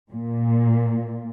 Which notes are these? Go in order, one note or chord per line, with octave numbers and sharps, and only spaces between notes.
A#2